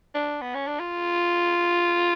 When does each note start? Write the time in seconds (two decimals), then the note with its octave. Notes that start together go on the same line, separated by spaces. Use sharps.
0.15 D4
0.41 B3
0.54 C#4
0.67 D4
0.80 F4